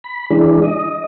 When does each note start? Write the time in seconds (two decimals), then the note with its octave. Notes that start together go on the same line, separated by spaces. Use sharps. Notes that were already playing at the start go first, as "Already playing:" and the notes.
0.04 B5
0.30 E3 G#3 D4
0.62 D#5